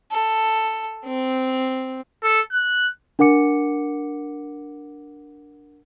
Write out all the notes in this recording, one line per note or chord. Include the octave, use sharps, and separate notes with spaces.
A4
C4
A4
F#6
D4 A#4 F#5 D6 C#7